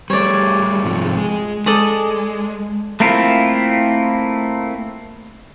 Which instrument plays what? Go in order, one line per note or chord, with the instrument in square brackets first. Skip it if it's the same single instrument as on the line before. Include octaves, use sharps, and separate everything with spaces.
[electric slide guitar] G3 A3 [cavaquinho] C#5 D5
[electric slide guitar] G#2 C3 F3
G#3
[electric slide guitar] G#3 [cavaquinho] A4 D5 D#6
[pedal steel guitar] A3 A#3 C4 E4 F4